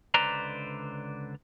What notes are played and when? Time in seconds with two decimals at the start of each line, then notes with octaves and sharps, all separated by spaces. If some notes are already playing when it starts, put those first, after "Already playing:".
0.14 C#2 D3 B4 C5 D5 A#5